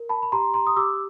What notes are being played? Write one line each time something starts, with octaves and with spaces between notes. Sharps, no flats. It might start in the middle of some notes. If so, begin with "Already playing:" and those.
Already playing: A#4
A5 B5
B5
G4 A#5 C6
A#5 C6
D#6
G4 D6 E6